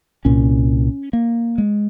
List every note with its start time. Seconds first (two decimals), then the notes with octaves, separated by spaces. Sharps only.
0.25 C2 A#2 C#4
1.13 A#3
1.58 G#3